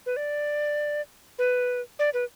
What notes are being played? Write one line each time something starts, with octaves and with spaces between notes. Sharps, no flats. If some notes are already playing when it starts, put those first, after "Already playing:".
B4
D5
B4
D5
B4